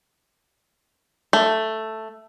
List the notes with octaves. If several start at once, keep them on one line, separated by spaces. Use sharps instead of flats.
A3